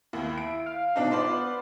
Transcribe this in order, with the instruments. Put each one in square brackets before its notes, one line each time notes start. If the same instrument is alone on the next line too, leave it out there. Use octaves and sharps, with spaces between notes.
[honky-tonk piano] D#2 [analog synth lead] E4
[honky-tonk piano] D7
[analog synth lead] F5
[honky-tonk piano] B2 D4 D#4
[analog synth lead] B3 [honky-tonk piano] F4 C5 D5